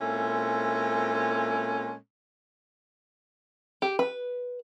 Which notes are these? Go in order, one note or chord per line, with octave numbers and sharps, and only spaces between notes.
A#2 G#3 C4 C#4 E4 A4
G4
B4